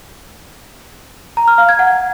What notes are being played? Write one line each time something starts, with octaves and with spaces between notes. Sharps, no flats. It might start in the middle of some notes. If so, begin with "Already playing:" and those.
A#5
F6
F5
G#6
F#5